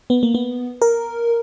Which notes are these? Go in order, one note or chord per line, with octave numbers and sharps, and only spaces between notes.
B3
A#3
B3
A#4